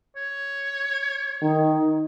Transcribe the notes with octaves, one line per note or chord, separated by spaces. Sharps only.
C#5
D#3 D#4